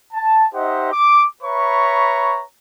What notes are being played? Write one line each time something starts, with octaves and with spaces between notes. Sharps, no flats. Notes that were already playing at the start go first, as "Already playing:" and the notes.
A5
D#4 G4 C5 D#5 E5 F#5
D6
B4 C#5 E5 A#5 B5 C#6